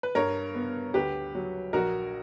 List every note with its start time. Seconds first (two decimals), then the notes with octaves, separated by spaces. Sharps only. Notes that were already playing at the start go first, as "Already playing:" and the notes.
0.03 B4
0.15 G2 A#4 C#5
0.54 B3
0.94 D2 G4 B4
1.35 F#3
1.73 A#1 F#4 A#4